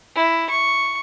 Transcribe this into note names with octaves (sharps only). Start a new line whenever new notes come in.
E4
C#6